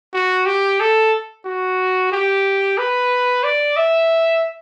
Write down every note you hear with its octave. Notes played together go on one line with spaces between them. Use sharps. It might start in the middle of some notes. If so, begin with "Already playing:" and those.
F#4
G4
A4
F#4
G4
B4
D5
E5